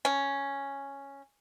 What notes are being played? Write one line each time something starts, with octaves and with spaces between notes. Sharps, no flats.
C#4